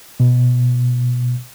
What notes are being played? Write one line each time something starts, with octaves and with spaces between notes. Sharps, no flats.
B2